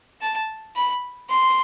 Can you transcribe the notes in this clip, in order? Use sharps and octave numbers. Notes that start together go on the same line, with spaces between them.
A5
B5
C6